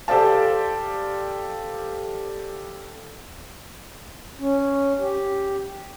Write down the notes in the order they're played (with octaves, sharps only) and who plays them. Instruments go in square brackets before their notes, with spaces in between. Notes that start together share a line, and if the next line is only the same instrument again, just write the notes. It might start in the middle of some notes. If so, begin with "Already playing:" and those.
[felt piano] G4 A4 C5 D5 F5 A5
[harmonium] C#4
G4